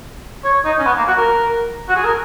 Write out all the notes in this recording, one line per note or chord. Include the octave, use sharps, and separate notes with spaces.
C#5
D#4
C#4
B3
A#3
F#4
A#4
F#4
G#4
A#4